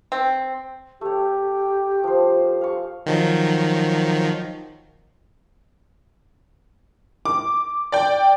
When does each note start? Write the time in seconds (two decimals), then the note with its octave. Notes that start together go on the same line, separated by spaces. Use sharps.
0.12 C4
1.01 A3 G4 C#5
2.04 F3 C5
2.61 F5 C#6
3.06 D#3 F3 F#3
7.25 D6
7.92 D5 G5